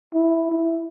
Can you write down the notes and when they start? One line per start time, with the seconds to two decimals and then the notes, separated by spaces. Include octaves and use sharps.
0.14 E4
0.51 E4